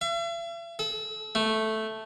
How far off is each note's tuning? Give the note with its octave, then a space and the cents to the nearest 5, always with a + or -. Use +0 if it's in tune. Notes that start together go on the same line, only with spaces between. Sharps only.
E5 +45
A4 -30
A3 -5